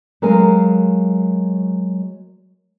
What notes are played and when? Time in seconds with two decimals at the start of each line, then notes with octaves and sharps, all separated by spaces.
0.22 F#3 G#3 A#4 F5 G#5